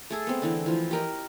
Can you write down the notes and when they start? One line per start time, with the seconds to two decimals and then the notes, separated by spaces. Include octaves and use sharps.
0.10 A3 G#4 A4
0.27 B3 C4
0.42 D3 E3 C4
0.66 E3 F3
0.91 G4 A#4 D#5